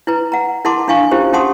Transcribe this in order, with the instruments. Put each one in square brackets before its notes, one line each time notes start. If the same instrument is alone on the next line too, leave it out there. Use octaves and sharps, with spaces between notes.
[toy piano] E4 B4 A#5
F#5 A#5
E4 A#4 F#5 A5 C6 D6
D4 E4 F5 G#5 C#6
C#4 E4 F4 G4 A#4 C5
C#4 G4 F#5 A5 C6 D#6